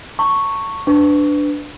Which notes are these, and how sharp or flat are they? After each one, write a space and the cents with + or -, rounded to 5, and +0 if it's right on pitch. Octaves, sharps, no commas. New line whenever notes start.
A5 +40 C#6 +0
D4 +0 B4 +25 C#6 +25